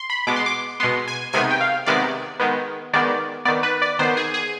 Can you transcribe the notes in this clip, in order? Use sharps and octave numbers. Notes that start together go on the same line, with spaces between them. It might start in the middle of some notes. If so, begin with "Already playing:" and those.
Already playing: C6
B5
B2 G#3 B3 D6
C6
D6
B2 G#3 B3 C6
G#5
C3 D#3 G#3 B3 G#5
G5
F5
C3 D#3 G#3 B3 D5
D#3 G#3 B3
D#3 G#3 B3 D5
D#3 B3 D5
B4
D5
D#3 B3 C5
G#4
G#4